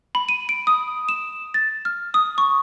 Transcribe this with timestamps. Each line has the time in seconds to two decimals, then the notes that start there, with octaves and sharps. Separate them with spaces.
0.15 B5
0.29 D#7
0.49 D7
0.67 D#6
1.09 E7
1.54 A6
1.85 F6
2.14 D#6
2.38 C#6